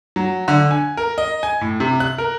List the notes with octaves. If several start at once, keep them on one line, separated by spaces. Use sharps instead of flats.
F#3
D3
G#5
A#4
D#5
G#5
A2
C3
F#6
A#4